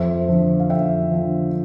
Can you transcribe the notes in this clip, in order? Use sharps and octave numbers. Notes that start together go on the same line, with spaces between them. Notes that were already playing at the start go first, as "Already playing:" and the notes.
Already playing: F2 C5 E5
D3 F3
F5
F2 E5 G5
D3 F3